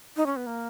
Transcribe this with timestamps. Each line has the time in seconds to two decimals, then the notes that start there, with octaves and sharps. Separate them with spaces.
0.16 D#4
0.26 C#4
0.36 B3
0.47 A#3